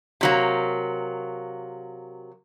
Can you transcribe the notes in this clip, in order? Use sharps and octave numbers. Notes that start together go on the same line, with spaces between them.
C3 F#3 A#3